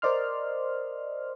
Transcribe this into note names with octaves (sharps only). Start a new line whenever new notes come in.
A#4 C5 D5 D#5 C6 F6